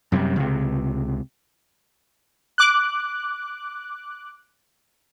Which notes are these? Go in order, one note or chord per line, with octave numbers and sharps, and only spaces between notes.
F#2 C3 F#3 G3
C#2 C3
D6 F#6